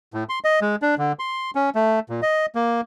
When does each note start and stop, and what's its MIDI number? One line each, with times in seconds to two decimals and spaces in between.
0.14 0.24 45
0.29 0.39 84
0.44 0.60 75
0.61 0.76 56
0.82 0.95 62
0.98 1.12 50
1.19 1.51 84
1.55 1.70 61
1.75 2.00 57
2.09 2.21 46
2.22 2.46 75
2.55 2.81 58